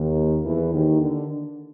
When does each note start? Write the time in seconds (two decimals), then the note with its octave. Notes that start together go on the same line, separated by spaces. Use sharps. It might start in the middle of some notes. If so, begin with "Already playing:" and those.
Already playing: D#2 D#3
0.45 E2 E3
0.73 D#2 D#3
1.01 D3